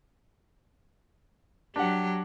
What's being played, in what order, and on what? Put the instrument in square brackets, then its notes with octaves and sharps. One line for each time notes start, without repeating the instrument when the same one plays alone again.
[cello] F#3 G4 [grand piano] D4 F#5